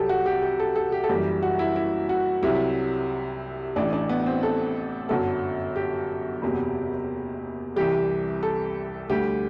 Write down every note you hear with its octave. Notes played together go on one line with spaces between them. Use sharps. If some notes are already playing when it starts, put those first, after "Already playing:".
Already playing: C2 C3 F#3 G4 A4
F#4
G4
G4
A4
A4
G4
A4
F#1 F#2 E3 G3 G4
F#4
E4
E4
F#4
C2 C3 F#3 E4
A1 A2 E3 D4
D4
B3
C4
A4
G1 F#2 D3 F#3 A4
G4
F#1 E2 C3 F#3
C2 C3 E3 G3 G4
A4
D2 D3 G3 G4